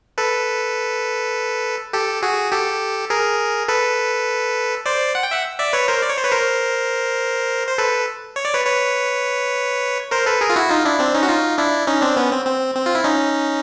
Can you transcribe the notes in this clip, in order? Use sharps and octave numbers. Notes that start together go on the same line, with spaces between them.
A4 B4
G4 A4
F#4 G#4
G4 A4
G#4 A#4
A4 B4
C5 D5
F#5
G5
E5 F#5
D5 E5
B4 C#5
A#4 C5
D5
C#5
C5
B4 C#5
A#4 C5
C5
A4 B4
C#5
D5
B4 C#5
B4 C#5
A#4 C5
A4 B4
G#4 A#4
F4
E4 F#4
D#4 F4
D4 E4
C4 D4
C#4 D#4
F#4
D#4 F4
D4 E4
C#4 D#4
C4 D4
B3 C#4
C4
C4
C4
F4
E4
C#4 D#4